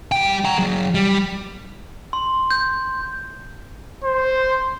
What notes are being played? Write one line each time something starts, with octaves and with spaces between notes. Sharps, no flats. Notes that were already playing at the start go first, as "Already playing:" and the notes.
G3 G5
F#5 A#5
F#3 G#4
G3
C6
G6
C5